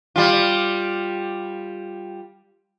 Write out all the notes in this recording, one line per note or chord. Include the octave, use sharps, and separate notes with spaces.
G3 F4